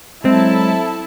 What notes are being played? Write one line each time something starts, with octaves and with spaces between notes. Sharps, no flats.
F#3 G#3 C4 E4 A4 A5